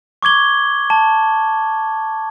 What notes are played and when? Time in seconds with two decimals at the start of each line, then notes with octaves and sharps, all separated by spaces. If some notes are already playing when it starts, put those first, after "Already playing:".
0.23 C#6 D6 G#6 G7
0.90 A5